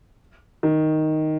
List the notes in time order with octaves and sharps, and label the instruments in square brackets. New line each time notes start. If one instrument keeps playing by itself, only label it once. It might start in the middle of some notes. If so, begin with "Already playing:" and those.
[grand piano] D#3